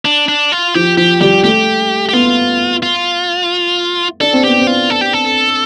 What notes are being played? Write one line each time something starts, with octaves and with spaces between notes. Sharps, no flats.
D4
D4
F4
F3 G4
F3 G4
G3 G4
A3 G4
G4
B3 F4
F4
D4 A4
C4
B3 G4
C4
F4
A4
G4
A4